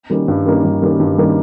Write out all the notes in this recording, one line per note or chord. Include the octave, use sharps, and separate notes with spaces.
D#3 G3 A#3 C#4
G2
D#3 G3 A#3 C#4
G2
D#3 G3 A#3 C#4
G2
D#3 G3 A#3 C#4